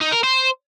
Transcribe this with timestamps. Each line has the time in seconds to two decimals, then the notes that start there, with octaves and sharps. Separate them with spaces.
0.01 D#4
0.12 A#4
0.24 C5